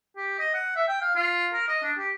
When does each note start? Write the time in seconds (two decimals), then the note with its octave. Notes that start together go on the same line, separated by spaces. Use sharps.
0.17 G4
0.39 D#5
0.54 F#5
0.76 E5
0.88 G5
1.01 F5
1.15 F4
1.53 A#4
1.68 D#5
1.83 D4
1.98 G4